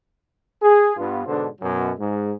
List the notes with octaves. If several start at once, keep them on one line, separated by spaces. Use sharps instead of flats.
G#4
G2 B3 F4
G#2 B2 D3 D4 A4 C5
F#2 B2 F#3
G#2 G#3